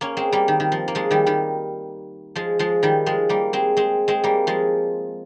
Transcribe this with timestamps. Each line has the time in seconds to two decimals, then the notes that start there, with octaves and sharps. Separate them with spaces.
0.01 A#3 C#4
0.17 G#3 C4
0.32 G3 A#3
0.48 D#3
0.60 D#3
0.72 F3
0.88 A#3
0.95 F3 G#3
1.11 D#3 G3
1.26 D#3 G3
2.35 F3 G#3
2.59 F3 G#3
2.83 D#3 G3
3.06 F3 G#3
3.29 G3 A#3
3.53 G#3 C4
3.77 G#3 C4
4.08 G#3 C4
4.24 G3 A#3
4.47 F3 G#3